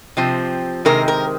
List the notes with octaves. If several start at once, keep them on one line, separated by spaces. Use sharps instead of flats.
C3 F3 C4
C3 D#3 G#3 C4 A#4
A#4